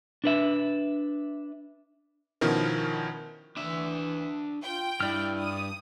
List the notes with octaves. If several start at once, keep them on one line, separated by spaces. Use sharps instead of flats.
D4 B4 E5
B2 D#3 F3 C#4 E4 A#4
E3 D4 E5
F4 G5
G2 E4 D5 F6
D#6